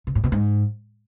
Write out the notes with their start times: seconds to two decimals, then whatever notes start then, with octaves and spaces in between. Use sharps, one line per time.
0.07 C3
0.15 A2
0.24 B2
0.32 G#2